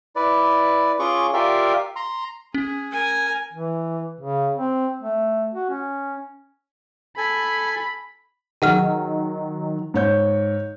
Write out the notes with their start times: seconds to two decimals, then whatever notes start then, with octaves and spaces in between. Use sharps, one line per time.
0.16 E4 B4 D5
0.99 C#4 F4 G#4 C#6 D6
1.33 F4 G4 A#4 D5 E5 F5
1.96 A#5 C6
2.54 C#4 G#4
2.92 A#4 G#5
3.53 E3
4.21 C#3
4.57 C4
5.02 A3
5.54 F#4
5.70 C#4
7.17 A4 G#5 B5
8.62 D#3 F#3 G#4 F#5 F6
9.94 G#2 C#5 G6